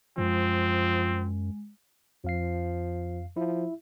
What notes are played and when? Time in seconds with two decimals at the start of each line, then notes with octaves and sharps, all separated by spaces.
0.18 F#2 F3 G#3 C4
2.24 F2 F3 F5 C7
3.37 F3 E4 E5